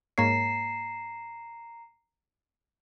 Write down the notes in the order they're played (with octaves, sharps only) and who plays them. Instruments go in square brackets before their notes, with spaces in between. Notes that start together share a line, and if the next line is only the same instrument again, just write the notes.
[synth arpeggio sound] G#2 A#3 C#5 [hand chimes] A#5 C7